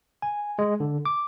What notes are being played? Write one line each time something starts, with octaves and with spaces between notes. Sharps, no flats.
G#5
G#3
D3
D6